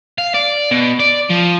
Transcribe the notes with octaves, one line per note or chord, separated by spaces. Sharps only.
F5
D5
B2
D5
F3